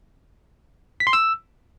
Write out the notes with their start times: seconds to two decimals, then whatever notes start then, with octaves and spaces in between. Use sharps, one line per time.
1.00 B6
1.07 C6
1.13 E6